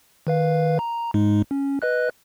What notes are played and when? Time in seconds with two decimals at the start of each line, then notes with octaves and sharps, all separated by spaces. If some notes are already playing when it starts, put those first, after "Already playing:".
0.27 D#3 B4 F5
0.79 A#5
1.14 G#2 G#3 D#4
1.51 C#4
1.82 B4 D#5 F#6